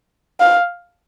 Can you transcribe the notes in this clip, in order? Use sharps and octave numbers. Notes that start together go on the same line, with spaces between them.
F5